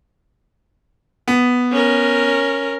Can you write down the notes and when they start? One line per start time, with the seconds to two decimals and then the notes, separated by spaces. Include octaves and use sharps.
1.28 B3
1.72 C#4 A#4